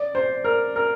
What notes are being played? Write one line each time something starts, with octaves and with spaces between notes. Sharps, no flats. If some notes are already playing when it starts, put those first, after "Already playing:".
Already playing: D5
C5
A#4
A#4